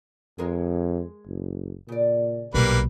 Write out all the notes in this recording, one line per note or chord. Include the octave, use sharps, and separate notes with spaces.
F2 G#3 G#4 A#4
F#1
A#2 C#3 D5
B1 A#2 G3 A#3 B4